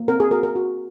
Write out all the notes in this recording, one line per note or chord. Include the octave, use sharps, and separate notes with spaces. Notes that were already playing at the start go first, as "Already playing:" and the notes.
Already playing: A#3
C4 A#4
G#4
F#4 A#4
A#4
F#4